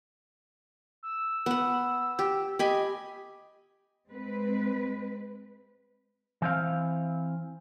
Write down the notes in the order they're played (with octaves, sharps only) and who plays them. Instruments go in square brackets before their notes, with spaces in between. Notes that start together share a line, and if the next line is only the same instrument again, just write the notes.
[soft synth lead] E6
[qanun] B3 F#5
G4
[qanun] G4 G#5 B5 [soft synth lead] D#5
[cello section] G#3 C4 B4
[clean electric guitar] E3 C4 F5